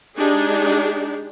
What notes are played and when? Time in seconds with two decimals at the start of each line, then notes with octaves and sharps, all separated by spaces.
0.17 G#3 D4 D#4 G4 G#4